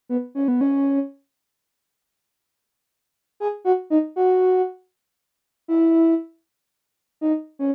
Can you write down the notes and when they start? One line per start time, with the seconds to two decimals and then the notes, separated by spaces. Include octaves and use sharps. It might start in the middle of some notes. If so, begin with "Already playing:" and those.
0.09 B3
0.35 C#4
0.48 B3
0.61 C#4
3.40 G#4
3.65 F#4
3.90 D#4
4.16 F#4
5.68 E4
7.21 D#4
7.59 C#4